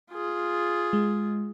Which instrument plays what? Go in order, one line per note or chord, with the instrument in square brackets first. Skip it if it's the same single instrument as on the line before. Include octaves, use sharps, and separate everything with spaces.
[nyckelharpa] F4 G#4
[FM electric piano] G#3